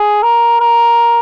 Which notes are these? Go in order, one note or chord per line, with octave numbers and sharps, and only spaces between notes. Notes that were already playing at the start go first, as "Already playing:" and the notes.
Already playing: G#4
A#4
A#4